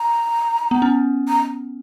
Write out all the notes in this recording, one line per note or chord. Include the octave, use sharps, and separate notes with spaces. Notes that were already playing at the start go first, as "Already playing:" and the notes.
Already playing: A#5
B3
C#4
A#5